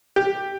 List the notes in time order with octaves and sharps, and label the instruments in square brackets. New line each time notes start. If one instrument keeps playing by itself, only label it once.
[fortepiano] G4